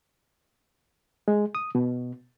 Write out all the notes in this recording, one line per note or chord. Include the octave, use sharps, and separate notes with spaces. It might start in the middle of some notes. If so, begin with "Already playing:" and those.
G#3
D#6
B2